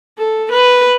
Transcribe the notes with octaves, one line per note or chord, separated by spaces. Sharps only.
A4
B4